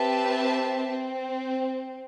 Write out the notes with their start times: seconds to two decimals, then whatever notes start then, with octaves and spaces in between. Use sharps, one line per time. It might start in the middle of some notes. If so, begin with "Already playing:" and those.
Already playing: C4 G4 B4 E5 A5
0.89 C4